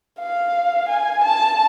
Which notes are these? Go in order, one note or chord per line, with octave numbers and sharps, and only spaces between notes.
F5
G#5
A5